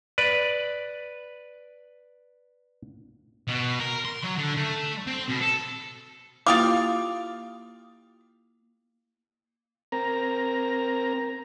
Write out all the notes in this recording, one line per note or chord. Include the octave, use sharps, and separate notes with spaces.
B4 D5
B2
A#4
C6
F#3
D3
A3
C4
B2
A4
A#3 E4 F4 G4 F5 D6 D#6
C4 A#4 A#5